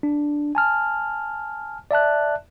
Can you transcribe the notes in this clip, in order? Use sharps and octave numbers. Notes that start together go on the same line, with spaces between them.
D4
G#5 A5 F6
D5 E5 A5 F#6